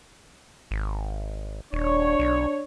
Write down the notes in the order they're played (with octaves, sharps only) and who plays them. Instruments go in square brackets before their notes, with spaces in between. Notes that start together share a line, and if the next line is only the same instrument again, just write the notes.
[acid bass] G#1
[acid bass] D#1 [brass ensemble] D4 C#5
[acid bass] B1